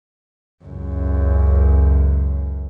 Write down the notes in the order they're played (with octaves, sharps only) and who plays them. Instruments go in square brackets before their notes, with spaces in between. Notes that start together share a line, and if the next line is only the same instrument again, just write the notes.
[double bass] C#2 F#2